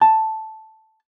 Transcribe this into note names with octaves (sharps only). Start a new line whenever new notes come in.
A5